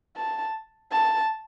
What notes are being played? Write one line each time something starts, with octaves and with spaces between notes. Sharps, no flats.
A5
A5